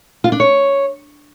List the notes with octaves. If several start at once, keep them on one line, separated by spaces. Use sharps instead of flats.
F4
D4
C#5